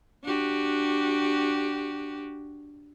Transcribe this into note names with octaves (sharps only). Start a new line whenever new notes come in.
D4 F#4 G4